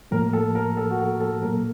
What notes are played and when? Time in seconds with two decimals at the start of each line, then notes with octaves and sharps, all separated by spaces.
0.11 A2 F3 A#3 A#4
0.33 A4
0.55 A#4
0.77 A4
0.90 F#4
0.99 A4
1.20 A4
1.42 A#2 F#3 A#3 A#4